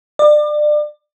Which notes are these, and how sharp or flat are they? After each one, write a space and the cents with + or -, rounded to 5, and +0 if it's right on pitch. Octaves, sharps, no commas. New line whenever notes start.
D5 +30